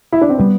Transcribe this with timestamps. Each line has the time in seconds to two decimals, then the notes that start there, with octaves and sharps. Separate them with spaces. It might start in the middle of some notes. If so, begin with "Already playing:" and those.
0.12 E4
0.21 D4
0.29 C4
0.38 D3 G3 B3